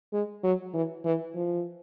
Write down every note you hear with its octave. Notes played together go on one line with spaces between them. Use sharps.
G#3
F#3
E3
E3
F3